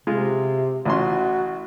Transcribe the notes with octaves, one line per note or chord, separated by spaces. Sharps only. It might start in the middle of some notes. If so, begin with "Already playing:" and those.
C3 G#3 F4
A1 C#4 F#4 C6